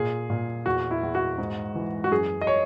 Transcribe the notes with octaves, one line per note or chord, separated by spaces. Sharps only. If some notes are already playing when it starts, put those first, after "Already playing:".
Already playing: A#2 G#4
A#2
E2 F#4
E4
E2
F#4
G#2
E3
F#4
F#2 G#4
D#5
C#5